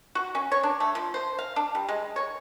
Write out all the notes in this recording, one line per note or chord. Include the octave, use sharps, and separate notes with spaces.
F#4
C#4
C#5
D4
A3
F3
C5
F5
D4
G3
G#3
C#5